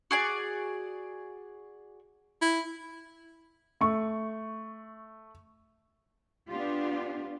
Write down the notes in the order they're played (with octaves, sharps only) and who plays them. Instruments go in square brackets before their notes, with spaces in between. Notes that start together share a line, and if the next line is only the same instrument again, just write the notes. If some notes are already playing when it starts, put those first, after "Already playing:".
[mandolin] F#4 G#4 D5
[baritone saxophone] E4
[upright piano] A3 C#6
[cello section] B3 D4 F4 G4